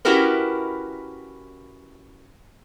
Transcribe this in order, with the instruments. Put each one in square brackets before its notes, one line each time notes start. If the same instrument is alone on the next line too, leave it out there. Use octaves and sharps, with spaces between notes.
[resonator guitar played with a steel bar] C#4 E4 F#4 G4 A#4 B4